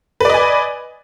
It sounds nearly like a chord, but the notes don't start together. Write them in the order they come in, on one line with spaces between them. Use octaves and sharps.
B4 D5 D#5 G#5